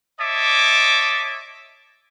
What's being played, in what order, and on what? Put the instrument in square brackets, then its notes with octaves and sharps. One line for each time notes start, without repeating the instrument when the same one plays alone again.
[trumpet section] C#5 D#5 E5 A5 D6